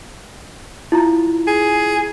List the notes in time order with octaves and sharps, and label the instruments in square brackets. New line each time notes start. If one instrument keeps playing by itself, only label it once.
[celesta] E4 F4 A#5
[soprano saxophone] G#4